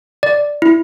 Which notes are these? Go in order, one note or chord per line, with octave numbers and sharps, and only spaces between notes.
D5
E4